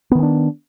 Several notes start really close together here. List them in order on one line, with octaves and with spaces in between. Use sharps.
B3 D#3 C4 D4